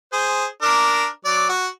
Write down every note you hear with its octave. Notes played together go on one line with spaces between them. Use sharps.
G#4 C5
D4 A#4
F#3 D5
F#4